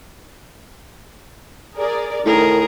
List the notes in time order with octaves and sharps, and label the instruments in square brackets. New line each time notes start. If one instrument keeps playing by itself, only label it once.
[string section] G#4 A#4 D5
[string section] D2 D#3 [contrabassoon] A2 [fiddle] G#4 A#4